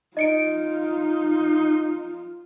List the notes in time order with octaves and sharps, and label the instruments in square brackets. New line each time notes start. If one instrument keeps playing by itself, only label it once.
[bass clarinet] D#4 [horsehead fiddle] F4 [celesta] D#5 C#7 D7